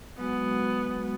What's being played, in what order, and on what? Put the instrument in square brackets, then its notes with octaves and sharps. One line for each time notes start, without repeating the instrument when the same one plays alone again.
[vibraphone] F#3 G#3 F#4 [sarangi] B3